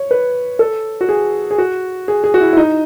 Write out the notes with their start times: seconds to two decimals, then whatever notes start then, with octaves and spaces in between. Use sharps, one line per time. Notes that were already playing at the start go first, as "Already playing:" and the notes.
Already playing: C#5
0.11 B4
0.59 A4
1.01 F#4
1.09 G#4
1.51 G#4
1.58 F#4
2.08 G#4
2.24 G#4
2.34 F#4
2.41 E4
2.53 E4
2.57 D#4